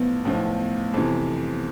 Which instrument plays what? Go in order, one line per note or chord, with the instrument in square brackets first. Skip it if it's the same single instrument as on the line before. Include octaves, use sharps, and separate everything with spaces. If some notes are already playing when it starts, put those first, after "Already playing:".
Already playing: [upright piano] B1 A2 F3 [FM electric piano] B3
[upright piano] B1 A2 F3
F2 C3 E3